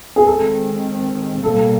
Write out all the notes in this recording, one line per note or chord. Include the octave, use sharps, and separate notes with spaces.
G#4
D#3 G#3 C4 A4
B2 G3 A#3 A4